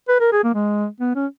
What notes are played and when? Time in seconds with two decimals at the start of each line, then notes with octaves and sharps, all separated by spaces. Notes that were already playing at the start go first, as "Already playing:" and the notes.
0.08 B4
0.20 A#4
0.32 G#4
0.44 A#3
0.54 G#3
1.00 B3
1.15 C#4